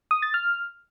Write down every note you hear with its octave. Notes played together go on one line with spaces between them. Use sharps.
D#6
A6
F6